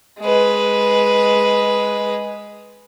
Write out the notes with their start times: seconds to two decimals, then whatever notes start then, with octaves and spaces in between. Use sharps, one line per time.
0.20 G#3 B4